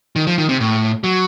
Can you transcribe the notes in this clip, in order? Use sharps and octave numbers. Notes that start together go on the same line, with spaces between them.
D#3
F3
D#3
C3
A2
F#3